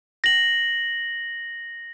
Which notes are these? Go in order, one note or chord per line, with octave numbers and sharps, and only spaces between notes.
A#6 F#7